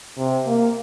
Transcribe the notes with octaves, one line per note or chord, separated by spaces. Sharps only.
C3
A#3